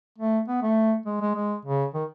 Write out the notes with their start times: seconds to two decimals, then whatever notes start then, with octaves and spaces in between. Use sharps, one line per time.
0.18 A3
0.48 B3
0.62 A3
1.06 G#3
1.21 G#3
1.35 G#3
1.65 C#3
1.94 D#3